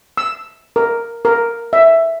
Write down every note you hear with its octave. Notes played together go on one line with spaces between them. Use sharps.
E6
A#4
A#4
E5